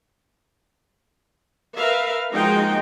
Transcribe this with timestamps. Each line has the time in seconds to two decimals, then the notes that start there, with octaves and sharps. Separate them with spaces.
1.77 A#4 B4 E5 F5
2.34 F3 G#3 A#3 D#4 F#4 G5